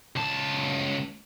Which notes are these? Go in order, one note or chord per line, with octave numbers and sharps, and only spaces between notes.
C#2 A5